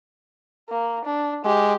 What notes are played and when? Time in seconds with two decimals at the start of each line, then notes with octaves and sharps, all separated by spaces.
0.69 A#3
1.05 D4
1.45 G#3 G4